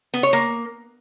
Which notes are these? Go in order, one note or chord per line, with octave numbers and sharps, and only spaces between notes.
B3
C#5
A#3